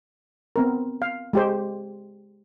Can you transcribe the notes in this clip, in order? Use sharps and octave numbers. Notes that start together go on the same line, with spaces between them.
B3 C4 A#4
F5
G#3 G4 C5